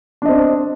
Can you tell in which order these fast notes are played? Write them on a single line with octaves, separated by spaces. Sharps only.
D4 D#5 C4